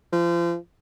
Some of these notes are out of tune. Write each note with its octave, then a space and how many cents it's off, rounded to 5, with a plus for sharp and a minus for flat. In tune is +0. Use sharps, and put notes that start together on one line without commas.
F3 -35